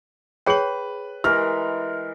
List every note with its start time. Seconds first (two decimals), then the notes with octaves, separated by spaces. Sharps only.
0.46 G#4 B4 C#5 G5 F#7
1.24 E3 G#3 G4 A#4 F6